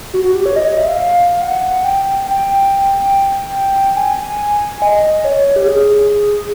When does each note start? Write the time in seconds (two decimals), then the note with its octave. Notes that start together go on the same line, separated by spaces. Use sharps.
0.13 F#4
0.24 F#4
0.35 G4
0.46 C#5
0.56 D#5
0.67 D#5
0.78 E5
0.88 F5
0.99 F5
1.42 F#5
1.84 G5
2.27 G5
3.96 G#5
4.82 D#5
5.24 C#5
5.56 G4
5.66 G#4